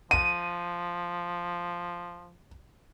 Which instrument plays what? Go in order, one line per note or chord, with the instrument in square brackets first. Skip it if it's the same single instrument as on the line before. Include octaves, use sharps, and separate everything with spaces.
[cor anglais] F3 [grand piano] D#7